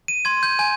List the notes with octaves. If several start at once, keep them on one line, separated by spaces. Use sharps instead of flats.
D#7
C6 G#6
G6
G#5 G6